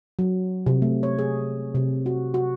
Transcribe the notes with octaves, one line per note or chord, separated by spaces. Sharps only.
F#3
C3
A3
C#5
G#4
C3
F#4
F#4